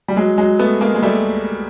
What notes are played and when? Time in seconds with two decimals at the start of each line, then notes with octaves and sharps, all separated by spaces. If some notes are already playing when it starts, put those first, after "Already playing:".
0.08 G3
0.16 F#3 G#3
0.38 F#3 G#3
0.59 A3 B3
0.81 G#3 A#3
0.95 G#3
1.02 G3 A3